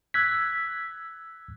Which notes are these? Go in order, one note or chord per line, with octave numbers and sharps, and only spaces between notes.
E6 F#6 G#6 B6